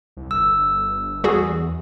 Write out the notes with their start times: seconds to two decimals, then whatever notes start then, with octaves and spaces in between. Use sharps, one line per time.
0.17 C2
0.31 G1 E6
1.24 E2 G3 F#4 G#4